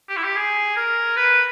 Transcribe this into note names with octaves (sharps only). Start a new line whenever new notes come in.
G4
E4
G4
G#4
A#4
B4